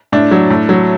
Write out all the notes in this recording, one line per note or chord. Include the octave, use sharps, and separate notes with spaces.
A2 D4
F#3
A2
F#3